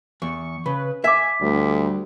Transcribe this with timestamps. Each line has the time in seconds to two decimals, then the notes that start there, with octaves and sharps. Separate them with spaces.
0.22 E2 C#6
0.66 C#3 B4
1.04 E5 G#5 D6 B6
1.41 D2 G3